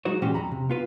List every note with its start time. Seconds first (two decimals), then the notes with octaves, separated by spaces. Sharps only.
0.05 F#3 G#3 D#4 F#4 C5 C#5
0.22 A#2 E3 G#3 C#4 F#4 G4
0.34 F2 A#5 B5
0.52 C3
0.70 B3 F4 B4